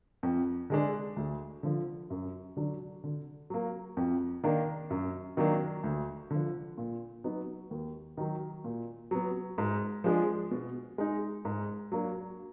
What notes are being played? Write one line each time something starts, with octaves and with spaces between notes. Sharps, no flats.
F2
D3 G#3 D4
D2
D3 F3
F#2
D3 F#3 D4
D3
F#3 A#3
F2
D#3 A#3 D4
F#2
D#3 F#3 A#3 D4
D2
D3 F3
A#2
F#3 B3 D#4
D#2
D#3 F#3
A#2
F#3 B3
G#2
F3 G#3 D4
B2
G#3 D#4
G#2
F#3 A#3 D4